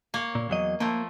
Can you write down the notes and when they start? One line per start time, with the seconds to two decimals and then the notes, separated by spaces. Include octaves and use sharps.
0.14 A#3 C#5
0.35 A#2
0.49 E2 F#3 D#5
0.80 F3 A3 A#3